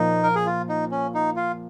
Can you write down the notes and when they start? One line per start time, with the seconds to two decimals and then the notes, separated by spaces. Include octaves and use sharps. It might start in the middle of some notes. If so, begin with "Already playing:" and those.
Already playing: A#2 F3 A#3 D#4
0.23 A#4
0.35 G#4
0.46 F4
0.69 D#4
0.92 C#4
1.15 D#4
1.36 F4